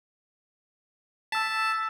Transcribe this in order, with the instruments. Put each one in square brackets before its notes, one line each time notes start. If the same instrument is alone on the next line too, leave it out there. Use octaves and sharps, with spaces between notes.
[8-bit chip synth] A5 [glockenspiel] E6 B6